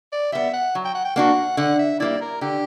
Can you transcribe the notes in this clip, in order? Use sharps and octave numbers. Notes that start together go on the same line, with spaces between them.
D5
G3 B3 E5
F#5
F#3
G5
F#5
G5
A#3 D4 F#4 F#5
D3 F#5
E5
G3 A#3 E4 D5
A#4
D3 G4